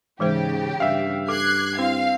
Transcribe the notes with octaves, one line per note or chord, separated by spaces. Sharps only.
G#2 C#3 E3 G#3 G4 C5
G2 E5 F5
A4 D6 F#6 G#6 C7
C4 E4 F5